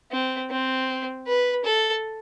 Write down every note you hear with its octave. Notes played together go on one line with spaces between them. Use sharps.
C4
C4
B4
A4